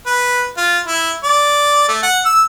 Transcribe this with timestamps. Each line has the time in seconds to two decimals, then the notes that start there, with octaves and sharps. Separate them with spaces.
0.06 B4
0.57 F4
0.87 E4
1.23 D5
1.89 A3
2.03 F#5
2.25 E6